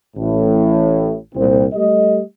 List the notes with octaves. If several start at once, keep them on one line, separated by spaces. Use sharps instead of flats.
A1 A2
C2 A#2 C4
G3 A3 G4 A4 D#5